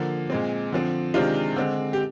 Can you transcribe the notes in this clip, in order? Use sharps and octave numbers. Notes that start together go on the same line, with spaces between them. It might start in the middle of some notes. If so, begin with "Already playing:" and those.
Already playing: D3 F3 A#3
A#2 G#3 C4
D3 F3 C4
C3 D#3 G#3 C4 D4 F4
D3 G#3 C4
G4